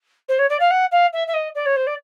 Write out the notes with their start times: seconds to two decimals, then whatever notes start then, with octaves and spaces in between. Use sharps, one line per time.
0.29 C5
0.39 C#5
0.50 D5
0.60 F5
0.71 F#5
0.92 F5
1.13 E5
1.28 E5
1.34 D#5
1.55 D5
1.66 C#5
1.76 C5
1.87 D5